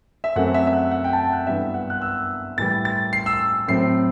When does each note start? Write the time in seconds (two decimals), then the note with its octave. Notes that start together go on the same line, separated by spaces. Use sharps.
0.24 E5
0.36 F#2 F#3 A3 C4 F#5
0.54 E5
0.67 E5
0.73 F#5
0.91 F#5
1.04 G5
1.13 A5
1.19 G5
1.33 F#5
1.47 G2 E3 G3 B3 E5
1.74 F#5
1.90 F#6
2.02 E6
2.57 A2 E3 G3 A6
2.85 A6
3.13 C7
3.26 E6
3.68 A2 F#3 A3 C4 C7